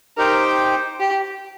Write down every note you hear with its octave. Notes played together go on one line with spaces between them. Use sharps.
D#4 G4 A#4 C5 G5
G4